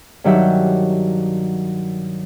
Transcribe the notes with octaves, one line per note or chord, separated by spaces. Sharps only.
G2 D#3 F#3 G4 E5 F#6